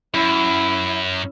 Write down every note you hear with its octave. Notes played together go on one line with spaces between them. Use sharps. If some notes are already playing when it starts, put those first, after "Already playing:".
F#2 E4